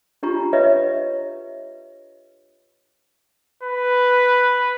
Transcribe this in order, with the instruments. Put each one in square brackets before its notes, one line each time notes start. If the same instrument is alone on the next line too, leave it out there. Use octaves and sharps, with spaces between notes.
[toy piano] D4 F4 G4 A#5 C#6
B4 C#5 D#5 E5
[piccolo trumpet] B4